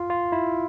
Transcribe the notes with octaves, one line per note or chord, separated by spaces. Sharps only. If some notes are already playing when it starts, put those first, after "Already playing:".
Already playing: F4
F4
E4